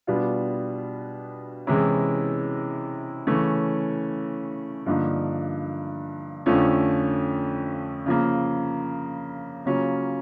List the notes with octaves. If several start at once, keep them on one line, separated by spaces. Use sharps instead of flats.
B2 G3 B3 D4 F4
C3 E3 G#3 C#4 E4
C#3 E3 A3 C#4
G2 D3 F3 A#3 D#4
F2 D3 F3 A3 C#4
C#3 F3 A#3
C#3 F#3 A#3 C#4 F4